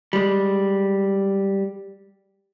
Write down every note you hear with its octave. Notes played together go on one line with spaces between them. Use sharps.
G3 G#3